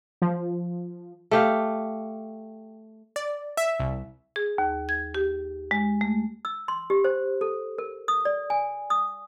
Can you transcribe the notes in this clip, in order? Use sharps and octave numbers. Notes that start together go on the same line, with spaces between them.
F3
A3 G4 F5
D5
E5
C2
G#4
D#2
G#6
G4
G#3
A3
E6
C6
G4
C5
A4
A#4
D#6
D5
G#5
D#6